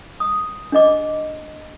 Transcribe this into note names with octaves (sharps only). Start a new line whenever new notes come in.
D#6
D4 G#4 D#5 D6